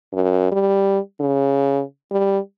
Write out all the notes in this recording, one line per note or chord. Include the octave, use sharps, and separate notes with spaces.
F#2
G3
C#3
G3